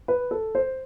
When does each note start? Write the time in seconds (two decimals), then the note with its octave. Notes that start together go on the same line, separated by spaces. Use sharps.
0.08 B4
0.31 A4
0.55 C5